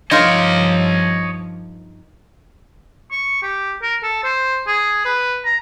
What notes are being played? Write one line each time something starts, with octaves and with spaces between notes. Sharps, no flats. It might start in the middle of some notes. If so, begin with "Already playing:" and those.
G2 F3 D#4 F4 A#4 C#5 D#5
C#6
G4
A#4
A4
C5
G#4
B4
A#5